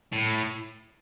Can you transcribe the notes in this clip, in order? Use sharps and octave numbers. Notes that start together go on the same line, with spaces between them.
A2